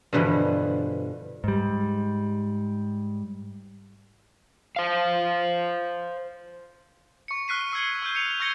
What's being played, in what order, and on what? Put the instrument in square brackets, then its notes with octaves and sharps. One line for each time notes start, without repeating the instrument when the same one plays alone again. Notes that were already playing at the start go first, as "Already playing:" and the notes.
[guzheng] G2 B2 D3 E3 F3
[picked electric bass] G#2 G3
[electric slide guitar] C5 F5
[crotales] C#6 C#7
C#6 F6 F#6 B6 C7 D#7
C#6 E6 F6 G#6 C#7
C#6 F6 G6
C#7 D#7 F7
C#6 F6 G#6 A#6 C#7 G7